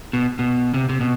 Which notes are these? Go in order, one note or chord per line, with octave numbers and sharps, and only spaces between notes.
B2
B2
C3
C3
B2